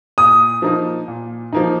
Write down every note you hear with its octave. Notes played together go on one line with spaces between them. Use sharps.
A#2 D#6
F3 A#3 D#4
A#2
F3 A#3 D#4